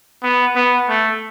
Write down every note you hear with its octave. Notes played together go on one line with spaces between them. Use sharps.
B3
B3
A3